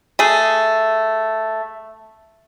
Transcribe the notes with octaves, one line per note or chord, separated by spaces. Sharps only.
A3 G#4